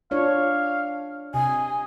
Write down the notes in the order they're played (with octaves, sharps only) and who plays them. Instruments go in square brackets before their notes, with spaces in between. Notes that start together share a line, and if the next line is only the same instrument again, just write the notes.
[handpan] D4 F4 C#5 [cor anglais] F5
[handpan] C3 [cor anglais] D#5 [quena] G#5